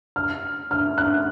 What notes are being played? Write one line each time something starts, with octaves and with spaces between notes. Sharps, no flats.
F6
F6
F#6